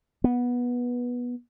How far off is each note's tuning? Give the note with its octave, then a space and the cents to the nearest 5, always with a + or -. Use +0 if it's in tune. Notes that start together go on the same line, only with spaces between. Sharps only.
B3 -15